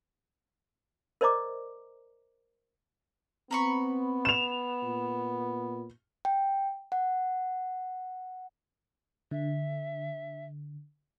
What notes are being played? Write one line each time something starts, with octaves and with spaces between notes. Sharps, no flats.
A#4 C5 D5 D#5 A#5 D6
B3 C4 A#5 B5 C#6
E7 F7
A#2
G5
F#5
D3 E5